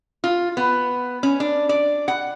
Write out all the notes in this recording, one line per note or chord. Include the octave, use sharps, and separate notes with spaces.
F4
B3
C#4
D4
D5
F#5